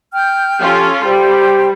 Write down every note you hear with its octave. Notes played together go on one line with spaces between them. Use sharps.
G5 F6 G6
F3 C#4 F4 G4 A4
G3 G4 C5 G5